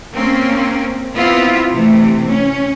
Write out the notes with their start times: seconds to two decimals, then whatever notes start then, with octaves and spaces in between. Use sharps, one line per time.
0.14 A#3 C4 C#4
1.14 B3 C4 E4 F4
1.71 C3 E3 A3
2.26 C#4